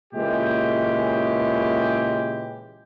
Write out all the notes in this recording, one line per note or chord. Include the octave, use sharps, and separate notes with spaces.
A#2 C#3 E3 G#3 G4